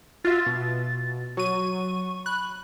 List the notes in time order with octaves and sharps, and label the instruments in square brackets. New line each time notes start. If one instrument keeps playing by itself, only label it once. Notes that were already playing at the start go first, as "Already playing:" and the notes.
[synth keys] F4 F#4 E5 [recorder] A6
[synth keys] B2
[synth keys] F#3 D#7 [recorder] C#6
[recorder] B5 [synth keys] F#6